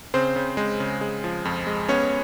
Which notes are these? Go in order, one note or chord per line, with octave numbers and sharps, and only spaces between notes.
C#3 C4 C5
C#3
G#3
C#3
G#3
F3
F2
G#3
B3 C#4 C#5